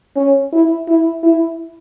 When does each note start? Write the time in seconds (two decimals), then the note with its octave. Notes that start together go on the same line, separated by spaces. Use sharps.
0.16 C#4
0.53 E4
0.88 E4
1.23 E4